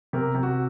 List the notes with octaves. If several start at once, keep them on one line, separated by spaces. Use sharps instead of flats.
C3 A#4
C3
F#4